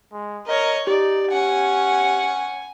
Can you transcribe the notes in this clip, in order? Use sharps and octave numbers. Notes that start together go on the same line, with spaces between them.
G#3
A#4 C#5 D#5
D#4 G4 D5
C#4 F#5 G#5